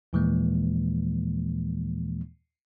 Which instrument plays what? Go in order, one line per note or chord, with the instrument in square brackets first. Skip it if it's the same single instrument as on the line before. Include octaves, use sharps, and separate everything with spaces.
[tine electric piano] D#2 A#2 E3 F3 G#3 A#3